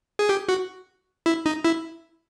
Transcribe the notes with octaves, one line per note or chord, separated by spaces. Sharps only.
G#4
G4
F#4
E4
D#4
E4